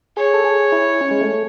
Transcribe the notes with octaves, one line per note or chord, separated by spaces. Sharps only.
G#4 C#5
A4
G#4
E4
C#4
G#3
A3